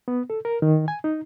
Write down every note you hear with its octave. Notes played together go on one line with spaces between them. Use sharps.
B3
A4
A#4
D#3
G#5
D#4